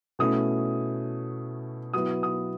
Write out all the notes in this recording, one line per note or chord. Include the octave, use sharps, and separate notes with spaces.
B2 A3 C#4 E4 D#6
F#3 B3 E4 D#6
D#6